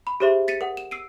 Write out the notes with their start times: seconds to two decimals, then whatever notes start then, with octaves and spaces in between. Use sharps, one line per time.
0.07 B5
0.20 G4 G#4 C5 E5 C6 D#7
0.48 A6 B6 C#7 D#7
0.61 A#4 F#5
0.77 E7
0.91 E6 C7 D7 D#7